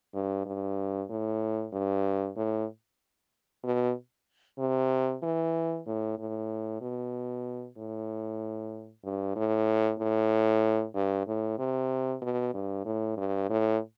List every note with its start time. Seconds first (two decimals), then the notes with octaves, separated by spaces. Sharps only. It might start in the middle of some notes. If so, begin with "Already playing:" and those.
0.14 G2
0.46 G2
1.10 A2
1.73 G2
2.37 A2
3.64 B2
4.59 C3
5.23 E3
5.87 A2
6.19 A2
6.81 B2
7.77 A2
9.04 G2
9.36 A2
9.99 A2
10.95 G2
11.27 A2
11.59 C3
12.22 B2
12.54 G2
12.85 A2
13.17 G2
13.49 A2